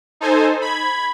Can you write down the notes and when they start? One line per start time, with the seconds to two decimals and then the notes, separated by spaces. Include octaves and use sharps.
0.21 D#4 A4 C5 G#5
0.61 B5 G#6